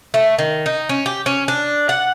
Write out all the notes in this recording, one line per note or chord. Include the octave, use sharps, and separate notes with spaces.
A3
D#3
D#4
C#4
G4
C#4
D4
F#5